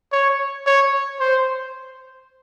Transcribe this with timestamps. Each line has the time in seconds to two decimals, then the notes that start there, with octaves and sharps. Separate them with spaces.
0.12 C#5
0.67 C#5
1.20 C5